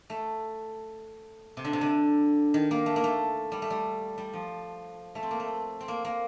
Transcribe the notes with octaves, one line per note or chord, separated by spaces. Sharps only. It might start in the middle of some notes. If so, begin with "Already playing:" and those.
A3
C3
D3
C3
D3
D#3
A#3
A3
A#3
A3
G3
A3
G3
G3
F3
A3
C4
A#3
A3
C4
A#3
A#3